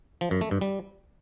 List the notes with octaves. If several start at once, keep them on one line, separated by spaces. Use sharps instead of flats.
F3
F#2
A3
G2
G3